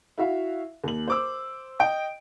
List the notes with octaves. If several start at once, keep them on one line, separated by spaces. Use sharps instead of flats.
E4 F#4 E5 F5
D#2 F#7
C5 D6 E6
D#5 G5 D7